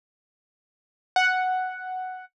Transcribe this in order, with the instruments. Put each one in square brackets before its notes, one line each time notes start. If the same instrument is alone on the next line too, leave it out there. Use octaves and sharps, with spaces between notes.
[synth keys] F#5